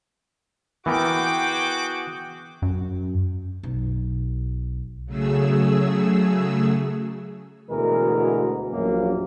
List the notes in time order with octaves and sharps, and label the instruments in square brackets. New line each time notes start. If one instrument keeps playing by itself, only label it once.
[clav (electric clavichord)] E3 B3 A#4 [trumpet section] F#4 G#4 G5 [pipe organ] D6
[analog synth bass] F#2
[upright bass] B1
[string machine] C#3 F#3 A3 G#4 E6
[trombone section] D2 B2 E3 G#3 A#4
A#1 F#2 A#3